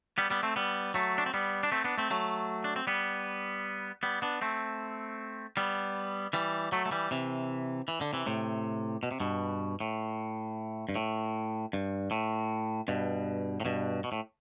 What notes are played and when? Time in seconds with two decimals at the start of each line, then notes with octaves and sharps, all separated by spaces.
0.18 G3 B3
0.31 G3 B3
0.43 A3 C4
0.56 G3 B3
0.94 F#3 A3
1.18 D4
1.26 C4
1.34 G3 B3
1.63 D4
1.72 A3 C4
1.84 B3 D4
1.98 A3 C4
2.11 F#3 A3
2.64 D4
2.76 C4
2.87 G3 B3
4.03 G3 B3
4.22 B3 D4
4.42 A3 C4
5.57 G3 B3
6.33 E3 G3
6.72 F#3 A3
6.86 A3
6.92 E3 G3
7.11 C3 E3
7.88 E3
8.01 D3
8.13 C3 E3
8.26 A2 C3
9.03 B2
9.11 C3
9.20 G2 B2
9.80 A2
10.89 G2
10.96 A2
11.73 G2
12.11 A2
12.88 G2 B2
13.60 A2
13.65 G2 B2
14.04 B2
14.12 A2